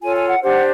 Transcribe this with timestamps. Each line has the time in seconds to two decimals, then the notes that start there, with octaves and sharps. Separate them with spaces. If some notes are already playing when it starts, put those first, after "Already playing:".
0.01 F4 A4 C#5 G#5
0.15 G#5
0.28 F#5
0.42 D4 G4 C5 F#5